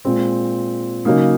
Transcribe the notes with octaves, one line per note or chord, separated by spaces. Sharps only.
A#2 G#3 C4
C#3 F#3 A#3 D#4